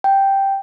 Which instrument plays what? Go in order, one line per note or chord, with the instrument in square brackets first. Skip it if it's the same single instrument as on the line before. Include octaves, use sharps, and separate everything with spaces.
[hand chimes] G5